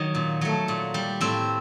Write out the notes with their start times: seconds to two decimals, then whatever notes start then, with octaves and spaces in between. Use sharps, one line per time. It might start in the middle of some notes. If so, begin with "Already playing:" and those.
Already playing: D#3 F#3
0.15 A#2
0.41 F#3 A3
0.68 A#2
0.94 G3
1.21 A2 C4